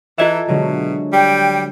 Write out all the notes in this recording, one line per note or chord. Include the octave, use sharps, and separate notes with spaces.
E3 F4 A4 D#5 E5 E7
B2 D3 F#3 G#3
G3 G5